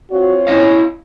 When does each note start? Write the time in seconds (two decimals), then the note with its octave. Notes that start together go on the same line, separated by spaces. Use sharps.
0.11 C4 F4 F#4 C#5
0.47 C#4 E4 D#5 F5